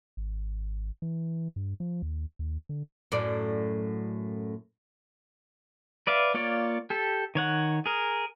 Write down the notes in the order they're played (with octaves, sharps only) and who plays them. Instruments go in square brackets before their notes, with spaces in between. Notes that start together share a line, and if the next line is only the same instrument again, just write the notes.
[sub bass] G#1
E3
G2
F3
D#2
D#2
D3
[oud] F#2 A2 D5
[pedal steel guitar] B4 D5 E5 F5
A#3 F4 C#5 D5
G4 A4
D#3 C#5 F#5
G#4 A#4